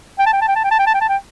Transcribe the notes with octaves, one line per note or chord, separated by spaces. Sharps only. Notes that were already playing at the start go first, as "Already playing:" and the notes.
G5
A5
G5
A5
G5
A5
G5
A5
G5
A5
G5
A5
G5